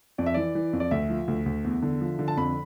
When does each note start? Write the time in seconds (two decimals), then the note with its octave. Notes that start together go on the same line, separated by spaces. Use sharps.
0.18 F2 D5
0.26 E5
0.34 E3 D5
0.55 E3
0.73 F2
0.80 D5
0.91 D2 E5
1.10 F3
1.28 D2
1.46 D2
1.64 E2
1.82 D3
2.01 F3
2.19 D3
2.28 A5
2.37 F2 B5